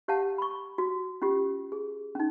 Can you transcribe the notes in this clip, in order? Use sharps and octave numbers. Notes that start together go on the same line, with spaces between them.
G4 C#5 F5 F#5 A5
B5 C#6
F#4
C#4 F4 G4
G#4
C#4 D#4